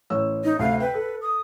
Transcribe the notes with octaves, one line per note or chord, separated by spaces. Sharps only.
A1 C#5 E6
D#4
D2 C3 F5
B4 G5
A4
D#6